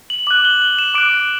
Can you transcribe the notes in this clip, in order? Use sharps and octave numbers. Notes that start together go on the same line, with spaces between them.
F#7
D6 F#6 F#7
G7
F#7
E7
D6 F#6 D7